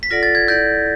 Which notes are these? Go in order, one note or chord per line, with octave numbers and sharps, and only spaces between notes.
B6
F4 A4 D5 F#5 A#6
A6
G#6
E4 A4 D5 F#5 G6